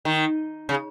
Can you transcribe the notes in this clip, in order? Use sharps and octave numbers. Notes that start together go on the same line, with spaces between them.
D#3
C#3